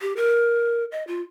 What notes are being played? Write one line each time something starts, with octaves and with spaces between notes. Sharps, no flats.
G4
A#4
D#5
F4